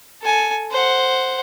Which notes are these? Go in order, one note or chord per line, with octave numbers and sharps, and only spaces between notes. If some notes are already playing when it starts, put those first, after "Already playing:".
A4 G#5
C5 F#5